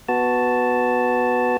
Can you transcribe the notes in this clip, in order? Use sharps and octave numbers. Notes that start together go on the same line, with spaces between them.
B3 F#4 A5